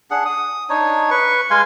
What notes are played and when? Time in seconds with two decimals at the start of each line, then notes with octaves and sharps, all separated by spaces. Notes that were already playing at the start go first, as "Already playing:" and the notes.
0.11 D4 G#4 F#5
0.25 D#6
0.70 D4 D#4 C#5
1.11 B4 C#6
1.50 G#3 F5 G#5 C6